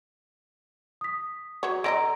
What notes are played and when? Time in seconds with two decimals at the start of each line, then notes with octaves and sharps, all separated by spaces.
1.01 D#6 B6
1.63 F#3 C#5
1.84 D3 D4 D#5 A#5 A#6 D7